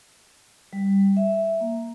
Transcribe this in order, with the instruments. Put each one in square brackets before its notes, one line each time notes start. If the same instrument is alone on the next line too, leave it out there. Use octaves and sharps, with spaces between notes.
[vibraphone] G3
E5
A#3